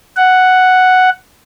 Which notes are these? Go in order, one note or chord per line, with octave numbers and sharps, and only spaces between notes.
F#5